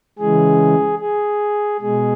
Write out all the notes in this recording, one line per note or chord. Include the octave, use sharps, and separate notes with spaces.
C#3 E3 G#3 G#4
G#4
B2 G#3 G#4